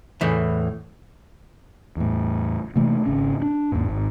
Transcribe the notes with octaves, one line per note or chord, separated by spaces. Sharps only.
E2 A2 E3
E2 A2
C3 E3 A3 A#3
G#1 C#3 C#4
D4
D#2 G#2
G#1